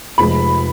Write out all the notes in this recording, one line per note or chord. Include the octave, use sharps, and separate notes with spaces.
F1 F2 F3 G#3 B5